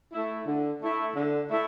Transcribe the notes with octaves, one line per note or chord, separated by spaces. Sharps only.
A3 E4
D3
A3 E4
D3
A3 E4